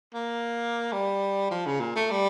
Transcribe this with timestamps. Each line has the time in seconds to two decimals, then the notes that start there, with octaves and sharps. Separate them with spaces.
0.14 A#3
0.92 G3
1.51 F3
1.67 C#3
1.80 A#2
1.96 A3
2.11 G3